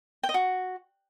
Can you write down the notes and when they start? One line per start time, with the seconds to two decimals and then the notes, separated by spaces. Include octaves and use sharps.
0.23 G5
0.29 D#5
0.34 F#4